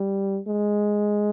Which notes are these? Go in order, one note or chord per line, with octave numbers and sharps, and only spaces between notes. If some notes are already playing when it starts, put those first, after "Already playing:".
Already playing: G3
G#3